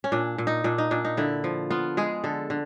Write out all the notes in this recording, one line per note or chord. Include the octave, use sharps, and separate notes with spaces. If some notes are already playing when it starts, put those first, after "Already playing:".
C#4
A#2 D4
A#2
D#4
A#2 D4
D#4
A#2 D4
D#4
D3 E4
F3
B3 F4
G#3 G#4
D3 A4
D3